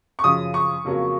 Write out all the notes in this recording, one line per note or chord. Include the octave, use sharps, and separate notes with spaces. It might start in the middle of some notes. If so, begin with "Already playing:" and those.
C#6
F#2 C#3 F3 D#6
C#6
F2 C#3 F#3 A#3